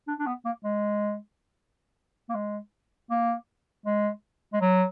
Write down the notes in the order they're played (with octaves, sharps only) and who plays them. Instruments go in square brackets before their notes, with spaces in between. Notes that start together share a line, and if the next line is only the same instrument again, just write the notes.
[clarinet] D4
D4
B3
A#3
G#3
A#3
G#3
A#3
G#3
G#3
F#3